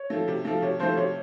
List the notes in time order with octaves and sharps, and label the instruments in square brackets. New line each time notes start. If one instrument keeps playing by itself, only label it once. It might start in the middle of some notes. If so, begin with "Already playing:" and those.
Already playing: [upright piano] C#5
[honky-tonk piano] F3 A3
C3
F3 A3
[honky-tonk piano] C3 [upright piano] C#5
[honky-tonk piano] F3 A3 [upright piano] C5
[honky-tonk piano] C3 [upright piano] C#5